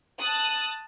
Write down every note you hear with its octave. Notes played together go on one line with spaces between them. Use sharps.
A5 D#6 F#6